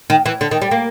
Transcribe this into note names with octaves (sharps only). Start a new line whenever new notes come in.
D#3
E3
D3
D#3
G3
A#3